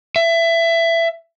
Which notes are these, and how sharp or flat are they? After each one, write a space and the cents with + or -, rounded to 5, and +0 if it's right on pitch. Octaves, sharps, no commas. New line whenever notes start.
E5 +20